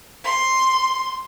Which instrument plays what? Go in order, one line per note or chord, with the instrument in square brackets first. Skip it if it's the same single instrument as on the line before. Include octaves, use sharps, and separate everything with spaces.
[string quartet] C6